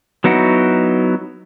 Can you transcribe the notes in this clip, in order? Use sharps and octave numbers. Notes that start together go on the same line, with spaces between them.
F#3 B3 D#4 E4 F#4